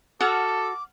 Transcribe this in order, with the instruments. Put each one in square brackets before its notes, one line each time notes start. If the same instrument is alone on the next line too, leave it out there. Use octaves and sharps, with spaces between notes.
[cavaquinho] F#4 [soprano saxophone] A4 [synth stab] F#5 F6 [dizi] D6